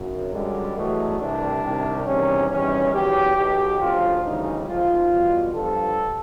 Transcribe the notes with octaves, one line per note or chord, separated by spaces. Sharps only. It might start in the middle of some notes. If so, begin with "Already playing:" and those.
Already playing: G#1 F#2 C#3 F#3
F#2 D3 G3 G#3
E2 B2 F#3 A3
C2 C3 E3 G3 D4
C2 C3 D#3
E2 C3 D#3 G3 C#4
E2 C3 D#3 G3 C#4
E2 C#3 F#3 G4
B1 B2 F#3 G4
D2 C#3 F3 F4
D2 C#3 E3 G3 D#4
G#1 G#2 F3 F4
E2 B2 G3
G2 D3 F3 A4